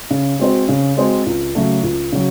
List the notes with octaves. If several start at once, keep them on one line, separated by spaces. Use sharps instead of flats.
C#3
G#3 C4 F#4 C5
C#3
G#3 C4 F#4 C5
C#2
C#3 F#3 A3
C#2
C#3 F#3